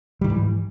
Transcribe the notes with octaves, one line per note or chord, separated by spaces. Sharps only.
G#2 D#3 E3 G3